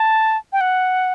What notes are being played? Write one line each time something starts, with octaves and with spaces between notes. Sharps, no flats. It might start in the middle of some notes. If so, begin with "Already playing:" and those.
Already playing: A5
G5
F#5